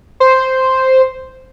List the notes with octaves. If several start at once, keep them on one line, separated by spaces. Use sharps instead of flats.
C5